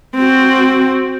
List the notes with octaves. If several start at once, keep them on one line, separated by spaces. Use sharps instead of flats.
C4 F#4